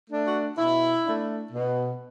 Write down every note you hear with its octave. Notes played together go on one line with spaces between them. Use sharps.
A3 D4
F#4
B2 E4
A3 D4
B2